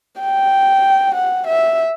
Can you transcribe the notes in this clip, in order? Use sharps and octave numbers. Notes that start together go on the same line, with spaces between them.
G5
F#5
E5